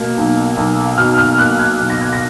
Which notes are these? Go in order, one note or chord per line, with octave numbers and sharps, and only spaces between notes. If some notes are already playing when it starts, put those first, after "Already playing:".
Already playing: B2 A#3
B1
B1
B2 F6
F6
A#3 F#6
G#6
B1
A#6
G#6
A#6